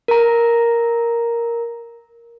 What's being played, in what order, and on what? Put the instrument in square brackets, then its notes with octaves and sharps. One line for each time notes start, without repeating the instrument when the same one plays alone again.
[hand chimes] A#4 A#5